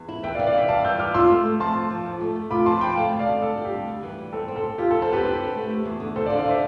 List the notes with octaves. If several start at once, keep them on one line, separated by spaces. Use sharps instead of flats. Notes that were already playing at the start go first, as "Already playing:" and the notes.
Already playing: E2
E4
E3 E5 G5
D5 F5
E3
D5 F5
E3 E5 G5
G3 F5 A5
E3 E6 G6
G3 D6 F6
F4 C6 E6
A3
A3
F3 A5 C6
F3
F3
F2
A3
A3
F4 B5 D6
F3 A5 C6
F3 G5 B5
A3 F5 A5
D2
D5 F5
D2
G3 A4
G3
G4
D2
G3
E3
G3
C4 A4
C4
A4
C4
F4 G4
A4
F3
A4 C5
B3 G4 B4
C4 G4 B4
D3
A3
A3
E2
D3
D2 A4 C5
D5 F5
D3
D5 F5
D3 C5 E5